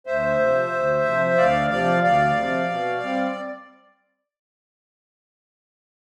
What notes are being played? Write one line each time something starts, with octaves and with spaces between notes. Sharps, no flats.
D2 C5 E5
C3 F3
D2
C3 F3
D2 D5 F5
C3 F3 D5 F5
D2 D5 F5
C3 F3
B2
G3 C4